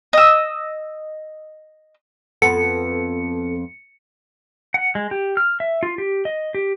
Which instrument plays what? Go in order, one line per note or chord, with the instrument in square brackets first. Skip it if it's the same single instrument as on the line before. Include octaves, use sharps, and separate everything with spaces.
[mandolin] D#5 E6
[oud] F2 B3 [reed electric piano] A4 [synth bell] C#7
[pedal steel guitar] F#5
G#3
G4
F6
E5
F4
G4
D#5
G4